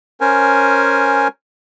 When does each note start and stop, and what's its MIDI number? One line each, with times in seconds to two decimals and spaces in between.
0.21 1.28 61
0.21 1.28 70
0.21 1.28 72
0.21 1.28 80